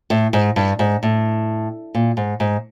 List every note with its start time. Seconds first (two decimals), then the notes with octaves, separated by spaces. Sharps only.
0.10 A2
0.33 G#2
0.56 G2
0.79 G#2
1.03 A2
1.95 A#2
2.17 G#2
2.40 G#2